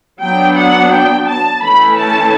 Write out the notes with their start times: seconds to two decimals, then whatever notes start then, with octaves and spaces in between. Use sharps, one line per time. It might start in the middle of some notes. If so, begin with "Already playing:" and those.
0.20 F#3 B3 D4 G5
0.55 F#5
0.90 G5
1.26 A5
1.61 E3 A3 C#4 E4 B5
1.96 A5